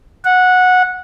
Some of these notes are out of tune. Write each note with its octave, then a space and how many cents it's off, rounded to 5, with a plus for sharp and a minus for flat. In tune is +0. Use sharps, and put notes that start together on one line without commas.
F#5 -15